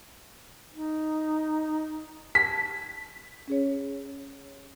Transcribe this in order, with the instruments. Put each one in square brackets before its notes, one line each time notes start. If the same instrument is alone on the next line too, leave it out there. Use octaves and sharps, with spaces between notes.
[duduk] D#4
[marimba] A5 G#6 [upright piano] B6
[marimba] C#4 G#4 C#5